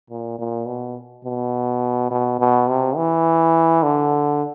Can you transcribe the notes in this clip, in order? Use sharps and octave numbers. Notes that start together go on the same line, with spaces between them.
A#2
A#2
B2
B2
B2
B2
C3
E3
D3